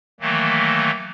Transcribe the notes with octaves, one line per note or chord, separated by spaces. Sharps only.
D#3 E3 F#3 A3 A#3